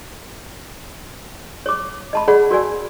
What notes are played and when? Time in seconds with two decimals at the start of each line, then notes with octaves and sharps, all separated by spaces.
1.66 C#5 D6
2.13 D#5 A5 B5
2.28 G#4 C#5 D5 F#5 B5
2.51 F#4 A#4 D5 G#5